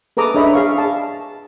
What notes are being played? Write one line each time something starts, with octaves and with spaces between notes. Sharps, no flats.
G#4 A4 B4 A#5 D6 D#6
D4 G#4 C#5 D#5 E5 B5
G#4 F5 C#6
A5